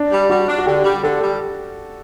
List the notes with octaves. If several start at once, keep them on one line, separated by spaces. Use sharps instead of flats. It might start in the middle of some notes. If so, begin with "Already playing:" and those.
Already playing: D4
G3
G3 F#4
D4
F#4
D3 G4
G3
D3 A4
G3